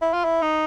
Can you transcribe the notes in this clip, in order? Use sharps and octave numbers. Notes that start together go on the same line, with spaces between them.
E4
F4
E4
D#4